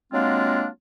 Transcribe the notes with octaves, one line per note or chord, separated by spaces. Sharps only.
F#3 G#3 A#3 C4 D4 F4